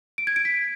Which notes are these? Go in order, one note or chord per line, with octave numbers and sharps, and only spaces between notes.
D7
G#6
D7
B6